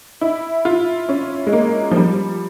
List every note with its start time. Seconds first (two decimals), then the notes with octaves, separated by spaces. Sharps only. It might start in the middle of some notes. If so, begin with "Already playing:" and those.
0.21 E4
0.65 F4
1.09 C#4
1.47 G#3
1.53 A#3
1.91 F3
1.96 G3